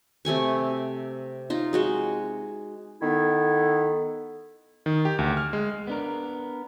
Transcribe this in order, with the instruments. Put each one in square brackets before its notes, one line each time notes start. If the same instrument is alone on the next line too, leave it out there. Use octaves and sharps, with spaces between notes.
[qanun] C3 A3 G#5 C#6
D#4 F4
G#3 F#4 G#4
[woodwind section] D#3 B3 E4 A4
[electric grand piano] D#3
G4
D2
F6
G#3
[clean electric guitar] B3 D4 A#4